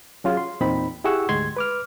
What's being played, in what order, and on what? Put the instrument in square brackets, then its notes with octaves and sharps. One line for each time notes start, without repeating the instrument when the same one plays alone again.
[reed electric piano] F#3 C#4 F4 F#4 G#4
C6
E2 A#2 C4 D#4 B5
E4 G4 G#4 F#5 C#6 E6
D2 G#2 G#3 C6 G#6
B4 D6 F6